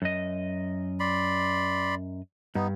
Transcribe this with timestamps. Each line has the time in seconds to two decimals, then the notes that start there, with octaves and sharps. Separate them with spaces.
0.02 F#2 D#5
1.00 D5 B5 C6
2.55 G2 B3 D#4